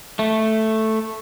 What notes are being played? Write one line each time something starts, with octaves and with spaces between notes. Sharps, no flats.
A3